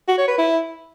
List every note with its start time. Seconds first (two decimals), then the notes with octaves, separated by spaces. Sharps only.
0.08 F#4
0.18 C#5
0.28 B4
0.38 E4